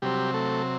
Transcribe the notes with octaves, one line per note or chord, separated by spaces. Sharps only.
C3 F#3 G3 C4 G4
A3 A4